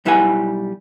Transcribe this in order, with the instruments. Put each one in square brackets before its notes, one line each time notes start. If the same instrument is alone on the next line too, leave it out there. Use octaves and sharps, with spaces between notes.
[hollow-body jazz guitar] B1 G3 E4 B4 F#5 G#5